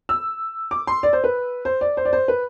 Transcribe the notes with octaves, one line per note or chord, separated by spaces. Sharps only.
E6
D6
C6
D5
C5
B4
C5
D5
C5
D5
C5
B4